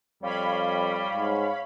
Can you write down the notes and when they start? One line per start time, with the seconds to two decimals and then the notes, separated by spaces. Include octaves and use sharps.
0.23 F2 G3 C#5 F5 B5
1.13 G#2